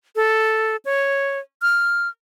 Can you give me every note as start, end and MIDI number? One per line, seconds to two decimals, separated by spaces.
0.16 0.76 69
0.85 1.39 73
1.62 2.08 89